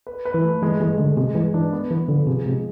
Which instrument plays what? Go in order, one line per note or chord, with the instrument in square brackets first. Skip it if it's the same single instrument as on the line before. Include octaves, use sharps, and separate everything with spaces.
[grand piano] B4
B4
[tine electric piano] E3
[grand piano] A3
[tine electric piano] E3 [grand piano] G#3
[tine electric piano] E3 [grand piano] G#3
[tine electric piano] D3 [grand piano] G#3
[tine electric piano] C3 [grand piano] G#3
[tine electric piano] E3 [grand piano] G#3
[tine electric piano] E3 [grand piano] D4
[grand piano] B3
[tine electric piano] E3 [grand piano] B3
[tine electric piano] D3 [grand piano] F3
[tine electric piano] C3 [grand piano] G#4
[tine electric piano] C3 [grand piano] G#3